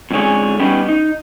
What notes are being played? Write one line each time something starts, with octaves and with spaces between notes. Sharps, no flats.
F2 G#2 D3 C#4 G#4
G3 B3 C#4 D#4 G4
D#4